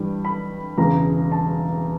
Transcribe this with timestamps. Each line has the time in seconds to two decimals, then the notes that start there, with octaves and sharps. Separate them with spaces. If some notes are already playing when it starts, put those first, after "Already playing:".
Already playing: G2 E3 G3
0.25 B5
0.78 E1 E2 C#3 A#5
1.32 A5